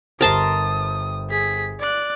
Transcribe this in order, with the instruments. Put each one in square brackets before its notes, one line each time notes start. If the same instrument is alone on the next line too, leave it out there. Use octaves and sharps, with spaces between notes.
[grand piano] G1 G4 C5 [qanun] A#4 A5 C6 [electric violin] D#6
[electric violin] G#4 B6
D5 F#6